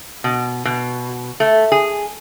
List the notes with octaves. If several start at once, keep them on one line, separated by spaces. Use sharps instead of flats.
B2
B2
A3
G#4